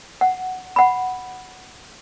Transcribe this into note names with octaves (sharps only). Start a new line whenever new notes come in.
F#5
F#5 B5